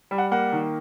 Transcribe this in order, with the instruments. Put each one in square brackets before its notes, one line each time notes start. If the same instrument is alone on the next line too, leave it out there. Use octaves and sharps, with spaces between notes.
[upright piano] G3
F#5
A#3 F#5
D#3